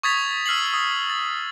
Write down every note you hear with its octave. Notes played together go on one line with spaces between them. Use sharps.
C#6 D#6 G#6 A6 B6 F7
E6 F6 C7 F#7
D#6
A6